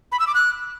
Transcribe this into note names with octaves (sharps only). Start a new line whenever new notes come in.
B5
E6
D6
F#6